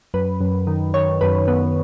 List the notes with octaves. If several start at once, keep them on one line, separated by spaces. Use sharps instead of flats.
F#2 B4
F#2
D#3
D#3 C#5
F#2 B4
F#2 B3